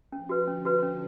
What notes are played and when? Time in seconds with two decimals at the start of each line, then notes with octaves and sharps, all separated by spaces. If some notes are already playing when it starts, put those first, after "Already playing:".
0.12 F3 C#4
0.29 F#4 B4
0.48 D3 C#4
0.65 F#4 B4
0.83 C#4